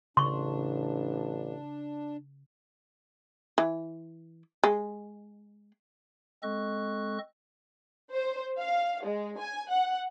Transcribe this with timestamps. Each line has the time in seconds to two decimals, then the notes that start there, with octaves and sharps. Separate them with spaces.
0.17 A1 C#3 D4 C6 C#6
3.58 E3
4.64 G#3
6.43 G#3 C4 A4 D#5 C#6 F#6
8.13 C5
8.59 F5
9.04 G#3
9.39 G#5
9.70 F#5